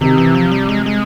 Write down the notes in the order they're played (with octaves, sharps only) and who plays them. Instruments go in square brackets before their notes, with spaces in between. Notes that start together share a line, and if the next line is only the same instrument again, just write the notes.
[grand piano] C3 [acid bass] D#3
[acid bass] E3
F3
G3
G#3
G#3